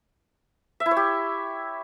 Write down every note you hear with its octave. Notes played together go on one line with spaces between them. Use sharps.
E5
E4
C#5
G4